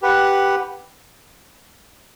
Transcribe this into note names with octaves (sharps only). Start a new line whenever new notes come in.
G4 B4 F#5